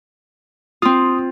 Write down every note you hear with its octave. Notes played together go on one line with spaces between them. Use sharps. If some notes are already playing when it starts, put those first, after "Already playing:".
C4 F4 C6 D#6